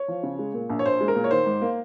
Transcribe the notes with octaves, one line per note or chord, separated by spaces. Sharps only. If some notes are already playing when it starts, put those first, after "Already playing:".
Already playing: C#5
F3
C#3
G#3
A#2
A#1
C#5
A#1 C5
G#3
A#4
A#2
C#5
D#3 C5
G#2
A#3